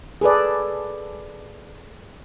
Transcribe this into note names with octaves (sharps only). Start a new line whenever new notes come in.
G#4 A4 B4 D5